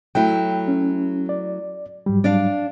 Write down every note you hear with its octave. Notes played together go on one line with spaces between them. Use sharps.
F#3 A3 E4 G5
C#4
D5
G#2 F#3 G3
D4 D5 F5